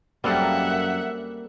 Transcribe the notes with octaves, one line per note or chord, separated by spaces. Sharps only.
F#2 G3 A#3 C4 A4 E5 F#5